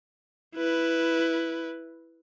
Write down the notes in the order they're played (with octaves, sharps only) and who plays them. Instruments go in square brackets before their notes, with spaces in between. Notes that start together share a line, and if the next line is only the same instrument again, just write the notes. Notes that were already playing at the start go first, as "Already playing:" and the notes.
[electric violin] E4 B4